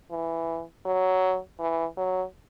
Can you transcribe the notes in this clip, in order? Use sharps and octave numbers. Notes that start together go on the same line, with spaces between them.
E3
F#3
E3
F#3